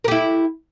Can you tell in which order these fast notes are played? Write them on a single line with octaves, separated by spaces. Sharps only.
A#4 G4 E4